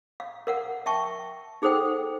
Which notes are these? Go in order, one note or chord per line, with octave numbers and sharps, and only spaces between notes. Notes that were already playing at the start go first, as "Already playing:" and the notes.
F5
A#4 F5 F#5
E5 G5 A5 C#6
D#4 G#4 A4 C5 F#5 G5